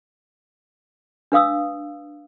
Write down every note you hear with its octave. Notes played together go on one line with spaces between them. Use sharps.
D4 B4 F5 D#6 E6